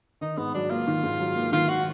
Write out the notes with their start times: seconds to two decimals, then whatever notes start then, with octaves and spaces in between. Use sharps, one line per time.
0.21 D#3 D#4
0.38 G#2 B3
0.55 F#3 D4
0.71 A#3 F4
0.87 D#3
1.03 G#2
1.19 F#3
1.36 A#3
1.52 D#3 F4
1.69 F#4